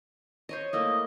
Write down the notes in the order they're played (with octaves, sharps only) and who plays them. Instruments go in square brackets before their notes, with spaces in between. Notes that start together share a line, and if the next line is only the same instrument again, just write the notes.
[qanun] C5 C#5 D#5
[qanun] A3 A#3 E4 [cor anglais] D#5